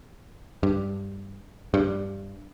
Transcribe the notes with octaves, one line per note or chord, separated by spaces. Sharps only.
G2
G2